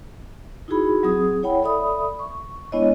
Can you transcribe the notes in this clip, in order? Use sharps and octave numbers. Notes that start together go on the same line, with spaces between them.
D#4 E4 F#4 G#4 B5
F#3 C4 G#4 D#6
E4 C#5 F#5 G5 B5
A4 D5 E5 B5 D#6
C#6
G#3 B3 D4 E4 C#5 D#5